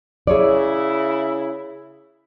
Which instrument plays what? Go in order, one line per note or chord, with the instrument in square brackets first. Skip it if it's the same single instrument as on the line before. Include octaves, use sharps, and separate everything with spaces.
[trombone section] C#3 E4 [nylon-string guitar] G#4 C#5 D5